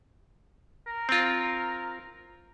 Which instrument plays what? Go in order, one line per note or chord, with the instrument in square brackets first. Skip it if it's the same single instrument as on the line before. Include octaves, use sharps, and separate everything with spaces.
[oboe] A#4
[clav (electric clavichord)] C4 F4